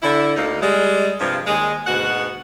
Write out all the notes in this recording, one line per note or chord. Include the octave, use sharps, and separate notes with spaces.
D3 E4
D2 D3 A#3 D#4
G3 G#3
G2 C3 F3
D#2 D#3 G#3
D2 G#2 B2 F#4 F#5